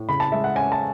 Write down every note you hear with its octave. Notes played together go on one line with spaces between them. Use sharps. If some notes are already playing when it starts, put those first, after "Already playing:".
Already playing: A2
C#3 B5
A5
G#3 E5
F#5
C#4 G#5
A5